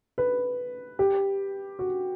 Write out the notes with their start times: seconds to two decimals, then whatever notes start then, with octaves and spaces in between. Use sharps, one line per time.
0.18 B4
0.99 G4
1.79 F#4